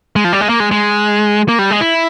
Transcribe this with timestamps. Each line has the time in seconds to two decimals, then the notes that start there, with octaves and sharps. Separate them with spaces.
0.16 G#3
0.24 F3
0.33 G3
0.41 G#3
0.49 A#3
0.60 G#3
0.71 G#3
1.49 A#3
1.59 G3
1.71 G#3
1.81 E4